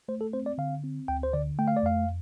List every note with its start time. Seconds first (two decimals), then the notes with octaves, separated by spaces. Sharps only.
0.08 A3 C5
0.21 A4
0.33 C4 C5
0.46 D5
0.58 D3 F5
0.84 C4
1.08 D2 G5
1.23 C5
1.33 D3 D5
1.59 A3 G5
1.68 F5
1.77 D5
1.83 F2 F5